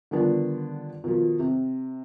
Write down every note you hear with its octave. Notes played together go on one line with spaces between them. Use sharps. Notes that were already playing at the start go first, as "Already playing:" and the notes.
D3 D#3 F3 G3 B3 D4
B2 D#3 F3
C3